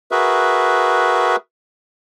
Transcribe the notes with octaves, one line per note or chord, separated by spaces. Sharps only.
F#4 G#4 A#4 B4 E5